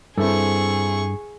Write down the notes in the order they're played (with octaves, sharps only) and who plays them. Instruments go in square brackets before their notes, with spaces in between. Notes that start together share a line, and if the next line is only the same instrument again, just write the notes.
[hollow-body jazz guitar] G2 [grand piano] C4 E4 A4 [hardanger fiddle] G#4 C#6